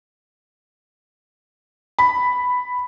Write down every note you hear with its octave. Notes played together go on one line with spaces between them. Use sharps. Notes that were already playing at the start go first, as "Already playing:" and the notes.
B5